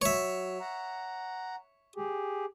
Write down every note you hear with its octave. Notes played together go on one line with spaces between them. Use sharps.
F#3 C#5 E5
F#5 A#5
G4 G#4